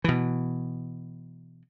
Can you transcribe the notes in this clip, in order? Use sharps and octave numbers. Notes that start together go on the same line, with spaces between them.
B2 E3